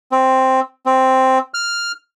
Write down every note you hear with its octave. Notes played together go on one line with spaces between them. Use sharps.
C4
C4
F6